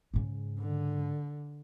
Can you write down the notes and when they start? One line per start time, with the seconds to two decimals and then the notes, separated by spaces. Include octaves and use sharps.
0.14 G#2 C#3
0.59 D3